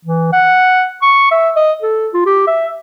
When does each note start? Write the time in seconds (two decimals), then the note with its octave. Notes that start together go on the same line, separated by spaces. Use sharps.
0.05 E3
0.32 F#5
1.02 C#6
1.31 E5
1.56 D#5
1.82 A4
2.14 F4
2.26 G4
2.47 E5